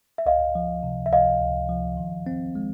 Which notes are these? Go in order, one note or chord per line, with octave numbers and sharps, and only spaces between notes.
E5
C#2 D#5 F5
F3
C3
E5
C#2 D#5 F5
C#2
F3
D#3
C4
G#3